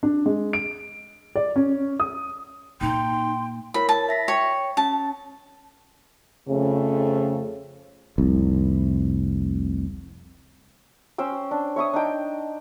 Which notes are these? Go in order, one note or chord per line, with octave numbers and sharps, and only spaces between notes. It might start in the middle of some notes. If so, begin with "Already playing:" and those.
D4
G#3
D7
D5
C#4
D#6
A#2 A#3 D#4 G5 C6
E4 A#4 C#5 B5
A5
E5 A#6 B6
C#5 G5 C#7
C#4 A5
F2 C#3 A3
F1 C2
C#4 C5 G5 E6
D4
C#5 E5 C#6 D#6
D4 D#4 G5